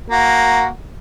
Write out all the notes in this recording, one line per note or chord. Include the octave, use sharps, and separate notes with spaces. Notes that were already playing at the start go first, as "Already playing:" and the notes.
A#3 F#4